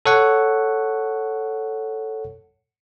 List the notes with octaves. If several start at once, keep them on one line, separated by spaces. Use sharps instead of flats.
A4 C#5 F#5